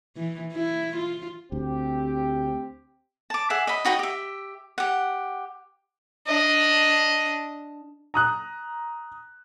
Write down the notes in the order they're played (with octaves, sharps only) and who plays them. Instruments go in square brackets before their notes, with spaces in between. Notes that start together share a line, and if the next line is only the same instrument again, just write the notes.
[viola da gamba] E3
E4
F4
[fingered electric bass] D2 [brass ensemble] C4 G4
[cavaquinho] A5 D6
G#4 E5 F#5
D#5 B5
D#4 F#4 D#5 G5
G4 E5
G4 F#5
[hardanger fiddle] D4 D#5
[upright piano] A#5 D#6 F#6